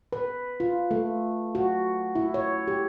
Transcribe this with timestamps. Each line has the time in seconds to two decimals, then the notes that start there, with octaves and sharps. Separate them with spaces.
0.12 B4
0.60 F4
0.91 A3
1.55 F#4
2.15 E4
2.34 C#5
2.68 G4